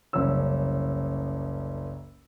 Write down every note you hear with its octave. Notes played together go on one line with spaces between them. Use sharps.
F#1 C2 C#4 E6